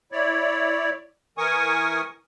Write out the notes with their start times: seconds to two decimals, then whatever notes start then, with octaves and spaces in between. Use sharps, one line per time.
0.12 E4 C#5 D5
1.38 E3 A#4 G#5 C#6 D#6